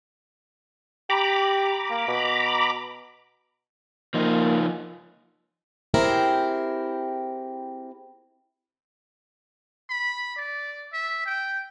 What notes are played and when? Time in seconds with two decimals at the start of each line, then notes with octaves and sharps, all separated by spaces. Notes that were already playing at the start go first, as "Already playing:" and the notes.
1.10 G4 A#5 B5 D6
1.90 A#3
2.08 B2
4.14 F3 A#3 D#4
5.94 C4 E4 G4 G#4 A#4
9.90 B5
10.37 D5
10.93 E5
11.26 G5